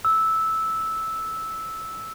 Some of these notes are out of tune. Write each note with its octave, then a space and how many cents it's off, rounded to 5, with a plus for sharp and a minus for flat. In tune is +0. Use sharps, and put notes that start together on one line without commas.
E6 -10